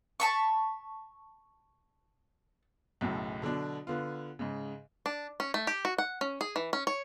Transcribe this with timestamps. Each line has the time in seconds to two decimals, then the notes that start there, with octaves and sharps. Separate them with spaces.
0.20 A5 B5 C#6
3.01 B1 F#2 A2 C#3
3.42 B2 D3 F#3 D4
3.87 D3 B3 F4
4.39 G#2 C#3
5.06 D4
5.40 C#4
5.54 A3
5.67 G4
5.85 F#4
5.98 F#5
6.21 C#4
6.41 G#4
6.56 E3
6.73 C#4
6.87 C#5